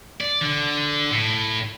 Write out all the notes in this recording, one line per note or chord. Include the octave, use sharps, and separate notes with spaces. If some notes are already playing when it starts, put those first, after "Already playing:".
D5
D3
A2